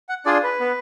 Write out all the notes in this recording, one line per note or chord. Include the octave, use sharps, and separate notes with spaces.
F#5
D4 F4 G#4 D5
B4
B3